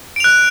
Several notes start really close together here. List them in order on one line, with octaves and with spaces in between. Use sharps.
D7 F7 F#6